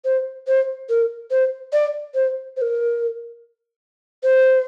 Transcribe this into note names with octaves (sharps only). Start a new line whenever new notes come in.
C5
C5
A#4
C5
D5
C5
C5
A#4
C5